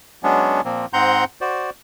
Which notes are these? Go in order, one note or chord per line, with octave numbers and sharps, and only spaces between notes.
F#3 G#3 B3 C#4 D4
A#2 F3 A#3 C4
G#2 C4 F#5 A#5 C6 G6
F#4 C5 D5